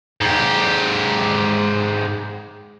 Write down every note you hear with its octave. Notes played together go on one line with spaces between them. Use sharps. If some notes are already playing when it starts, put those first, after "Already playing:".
G#2 G4